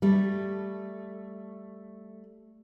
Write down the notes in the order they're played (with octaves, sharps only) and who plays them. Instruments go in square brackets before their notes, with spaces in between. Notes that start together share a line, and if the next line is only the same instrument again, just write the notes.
[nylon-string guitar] G3 A3